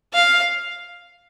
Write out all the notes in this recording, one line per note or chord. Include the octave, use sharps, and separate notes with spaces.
F5